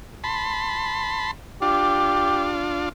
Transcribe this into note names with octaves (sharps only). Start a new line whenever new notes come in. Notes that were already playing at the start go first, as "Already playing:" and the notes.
A5 B5 C6
D4 F4 G4